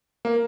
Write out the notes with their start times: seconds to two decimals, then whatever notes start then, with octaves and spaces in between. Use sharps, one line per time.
0.25 A#3